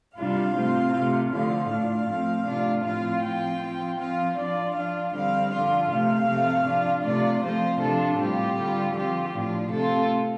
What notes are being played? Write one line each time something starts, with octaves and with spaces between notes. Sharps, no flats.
C3 G3 D4 F4 F5
C3 A3 C4 F4
C3 A3 F4
D3 F3 A3 F4 F5
A2 A3 D4 F4 F5
F3 A3 C4
C3 A3 D4 F4
A2 F3 C4 F4 F5
F3 C4 F4 G5
F3 C4 F4
F3 C4 F4 F5
F3 D4 F4 D5
F3 D4 F4 F5
D3 G3 C4 F5
D3 F3 D4 F4 F5
C3 A3 C4 F5
C3 F3 A3 C4
F3 D4 F4
C3 A3 F4 D5
F3 A3 C4 F4 C5
C3 F3 D4 F4 A4
A2 G3 C4 F4 G4
D3 G3 F4
F3 C4 F4 G4
A2 F3 D4 F4
C3 A3 C4 F4 A4